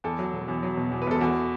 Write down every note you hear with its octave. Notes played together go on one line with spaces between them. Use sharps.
E2 A4
F#3
E1
E2
F#3
B2
E2
B4
E1 A4
E2 F#4